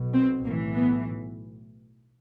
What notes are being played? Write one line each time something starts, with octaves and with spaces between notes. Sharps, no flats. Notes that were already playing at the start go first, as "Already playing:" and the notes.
Already playing: B1 B2
C4
B1 A2 E3 A#3
B3